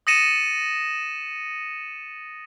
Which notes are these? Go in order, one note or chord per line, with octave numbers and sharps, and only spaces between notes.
D#6 A6 A#6 C#7 D#7 E7